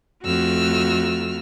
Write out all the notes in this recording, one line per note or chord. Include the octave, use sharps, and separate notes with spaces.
F2 A3 F#4 E6 F6